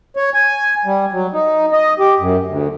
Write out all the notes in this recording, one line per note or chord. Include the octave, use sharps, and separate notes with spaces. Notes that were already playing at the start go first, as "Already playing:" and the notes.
C#5
G#5
G3
F#3
D#4
D#5
G4
F#2
D2